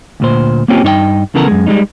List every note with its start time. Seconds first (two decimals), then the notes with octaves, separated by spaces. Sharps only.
0.20 D2 A#2 C5
0.68 A#3 C4 C#4 F4 G4
0.83 G2 D#4 C#5 G5
1.35 C#3 E3 B3 A4 A#4
1.47 F#2 G#3
1.67 G3 G#3 C#4 D#4